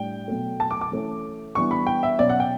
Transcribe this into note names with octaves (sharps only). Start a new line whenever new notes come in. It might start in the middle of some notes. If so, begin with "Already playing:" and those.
Already playing: A2 G3 D4 G5
B2 F#3 A3
A5
D6
D6
E3 A3 C#4
E3 G3 B3 D4 C#6
B5
G5
E5
B2 F#3 C#4 D5
F#5
G5